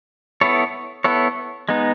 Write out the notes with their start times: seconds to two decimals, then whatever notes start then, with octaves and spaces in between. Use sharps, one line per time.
0.41 B3 E4 A4 C#5
1.04 B3 E4 A4 C#5
1.69 G#3 B3 D#4